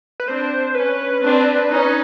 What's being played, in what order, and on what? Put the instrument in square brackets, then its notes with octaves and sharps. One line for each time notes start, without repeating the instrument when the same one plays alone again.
[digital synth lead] B4
[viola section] C4 D4 [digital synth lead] C5
[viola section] C#4 [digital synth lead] B4
[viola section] C4 D4
C#4 D#4